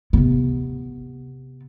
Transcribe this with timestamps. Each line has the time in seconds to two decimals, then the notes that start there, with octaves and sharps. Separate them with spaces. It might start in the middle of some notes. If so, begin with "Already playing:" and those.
0.13 C3 B3